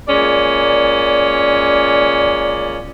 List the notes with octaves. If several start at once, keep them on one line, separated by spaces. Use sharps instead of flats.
A#2 G#3 C#4 D5